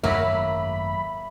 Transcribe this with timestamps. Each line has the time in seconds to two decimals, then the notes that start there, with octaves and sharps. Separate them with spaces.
0.04 G#1 F#2 F#3 A3 A#3 E5 B5